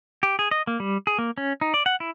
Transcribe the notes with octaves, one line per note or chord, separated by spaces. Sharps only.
G4
G#4
D#5
A#3
G3
G#4
A#3
C#4
D#4
D5
F#5
E4